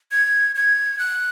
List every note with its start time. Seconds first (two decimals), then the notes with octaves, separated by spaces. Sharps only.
0.12 G#6
0.55 G#6
0.99 F#6